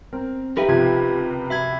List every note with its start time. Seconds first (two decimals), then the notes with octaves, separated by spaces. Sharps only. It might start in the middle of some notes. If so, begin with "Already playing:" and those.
0.13 C4 A#4
0.57 D#4 G4 A#4 B4 E5
0.68 C#2 C3 F3 F4 G#6
1.50 F#4 E5 B5 G#6